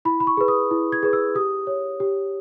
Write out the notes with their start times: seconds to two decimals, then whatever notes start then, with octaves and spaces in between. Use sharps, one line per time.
0.05 E4 B5
0.20 B5
0.27 C#6
0.37 G#4 B4
0.48 D#6
0.71 E4
0.92 G#6
1.03 G#4 B4
1.13 E6
1.35 G4 D#6
1.67 C#5
2.00 G4